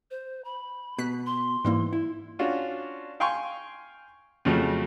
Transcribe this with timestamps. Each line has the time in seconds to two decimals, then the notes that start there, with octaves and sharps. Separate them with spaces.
0.11 C5
0.45 B5
0.98 B2 F#6 B6
1.26 C6
1.65 G#2 E3 G3 A#3
1.93 E4
2.39 C#4 D4 F4 F#4
3.20 F5 G5 G#5 C6 C#6
4.45 F2 C#3 F3 F#3 A3